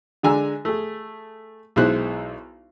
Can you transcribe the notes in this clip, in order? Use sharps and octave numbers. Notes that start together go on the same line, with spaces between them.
D3 G#3 D4 G#5 A#5 E6
A3 G#4
B1 G#3 D#4 E4 C5 F#6